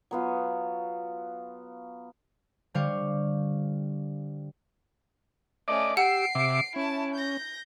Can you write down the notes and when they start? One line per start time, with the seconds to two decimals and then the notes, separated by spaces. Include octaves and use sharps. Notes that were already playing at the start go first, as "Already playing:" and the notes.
0.11 F#3 B3 F4
2.74 D3 G3 C5 F5 C#6
5.68 A3 C#4 D5 D#5 D6
5.97 G4 F#5 E6 C7 D7
6.35 C3 E5 D6
6.76 C#4 E4 A5
7.14 G6 A#6